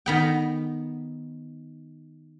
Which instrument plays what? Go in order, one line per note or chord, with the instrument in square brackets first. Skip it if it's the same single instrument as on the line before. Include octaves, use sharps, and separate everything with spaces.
[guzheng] D#3 B3 G5